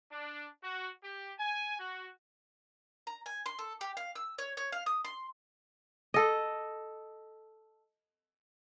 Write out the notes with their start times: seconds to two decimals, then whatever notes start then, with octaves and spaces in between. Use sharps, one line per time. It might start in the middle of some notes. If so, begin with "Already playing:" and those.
0.12 D4
0.63 F#4
1.03 G4
1.39 G#5
1.79 F#4
3.07 A#5
3.26 G#5
3.46 C6
3.59 A4
3.81 G4
3.97 F5
4.15 E6
4.38 C#5
4.57 C#5
4.72 F5
4.86 D#6
5.05 C6
6.14 A4 D#5